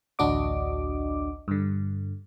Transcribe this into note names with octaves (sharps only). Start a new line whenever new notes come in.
A1 D2 D4 F#4 D#5 D6
G2 D3